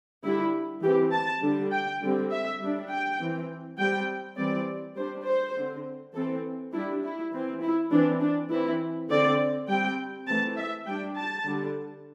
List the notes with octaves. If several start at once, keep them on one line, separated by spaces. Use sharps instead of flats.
D3 G3 D4 E4
E3 C4 G4
A5
D3 G3 D4
G5
D3 G3 C4
E5
G3 D4
G5
E3 C4
G3 C4 G5
E3 G3 C4 D5
G3 D4 C5
C5
D3 C4
E3 C4 A4
G3 D4 E4
E4
E3 C4
E4
E3 C4 D4
D4
E3 C4 E4
D3 C4 D5
G3 C4 G5
E3 A3 C4 A5
E5
G3 D4 G5
A5
D3 G3 D4